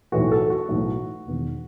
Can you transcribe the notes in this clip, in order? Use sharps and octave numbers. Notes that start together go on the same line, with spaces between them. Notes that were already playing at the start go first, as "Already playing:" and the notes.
B1 A2 E3 A3 F#4
A4
F#4
B1 A2 E3 A3
E1 E2 D#3